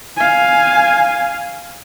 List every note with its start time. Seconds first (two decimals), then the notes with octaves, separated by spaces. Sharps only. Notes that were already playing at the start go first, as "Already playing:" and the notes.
0.17 F5 G#5